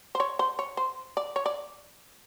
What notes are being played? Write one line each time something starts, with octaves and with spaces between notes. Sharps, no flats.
C5
C#5
C5
C#5
C5
D5
C#5
D5